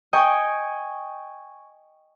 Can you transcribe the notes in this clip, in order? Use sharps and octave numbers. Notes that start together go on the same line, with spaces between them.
D#5 G5 G#5 C#6